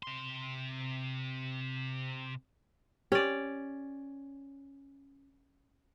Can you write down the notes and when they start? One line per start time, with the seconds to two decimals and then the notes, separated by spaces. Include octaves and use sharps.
0.03 C3 C6
3.12 C#4 G4 D5